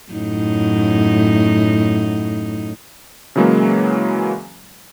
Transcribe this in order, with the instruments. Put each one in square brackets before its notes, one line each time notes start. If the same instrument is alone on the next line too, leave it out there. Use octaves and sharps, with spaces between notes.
[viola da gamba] F#2 A2 D#4
[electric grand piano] C#3 E3 F#3 G#3 A#3